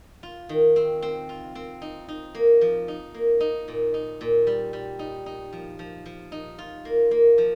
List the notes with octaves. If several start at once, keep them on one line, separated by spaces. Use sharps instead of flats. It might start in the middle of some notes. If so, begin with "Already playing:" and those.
F4
D#3
C4
C4
F4
C4
D#4
D#4
A#3
F3
D#4
A#3
D#4
A#2
D#4
A#2
G3
G3
D#4
D#4
F3
F3
F3
D#4
F4
A#3
A#3
F3